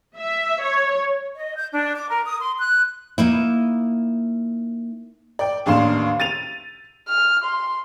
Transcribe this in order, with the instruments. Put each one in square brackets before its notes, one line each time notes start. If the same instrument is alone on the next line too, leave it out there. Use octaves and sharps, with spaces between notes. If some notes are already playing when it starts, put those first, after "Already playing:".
[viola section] E5
C#5
[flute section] D#5
G6
D4
D6
A#4
D#6
C6
F#6
[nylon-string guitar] A#3 D#4 E4
[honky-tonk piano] D5 G5
A1 D#2 D4 F5 C6 E7
A6 D#7 F7
[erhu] F6
C6